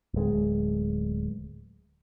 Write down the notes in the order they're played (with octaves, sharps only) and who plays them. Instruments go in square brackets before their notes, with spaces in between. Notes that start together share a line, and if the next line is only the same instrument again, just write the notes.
[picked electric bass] D1 G#3